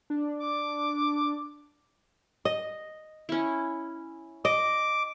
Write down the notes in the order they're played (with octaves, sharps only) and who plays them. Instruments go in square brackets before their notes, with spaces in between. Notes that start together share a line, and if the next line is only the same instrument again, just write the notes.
[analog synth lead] D4
[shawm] D6
[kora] D#5
[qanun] C#4 E4
[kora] D#5 [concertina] D6